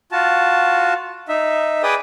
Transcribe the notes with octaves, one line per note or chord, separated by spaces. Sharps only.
F4 F#4 A5
D#4 E5
G#4 B4 D5 G5 D#6